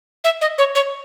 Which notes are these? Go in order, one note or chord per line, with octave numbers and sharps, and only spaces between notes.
E5
D#5
C#5
C#5